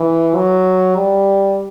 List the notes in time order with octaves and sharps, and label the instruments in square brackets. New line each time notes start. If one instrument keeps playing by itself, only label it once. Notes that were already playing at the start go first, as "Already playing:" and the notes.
Already playing: [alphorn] E3
F#3
G3